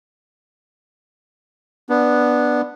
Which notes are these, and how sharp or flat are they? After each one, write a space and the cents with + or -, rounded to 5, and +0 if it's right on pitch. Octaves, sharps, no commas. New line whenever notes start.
B3 -5 D4 +5